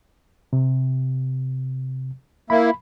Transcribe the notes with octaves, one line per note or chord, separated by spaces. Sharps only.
C3
A#3 E4 B5